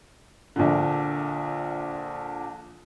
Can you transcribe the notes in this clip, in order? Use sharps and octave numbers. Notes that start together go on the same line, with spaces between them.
A#1 A#2 D3